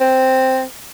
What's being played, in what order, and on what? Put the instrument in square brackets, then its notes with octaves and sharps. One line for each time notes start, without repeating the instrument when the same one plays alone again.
[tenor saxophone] C4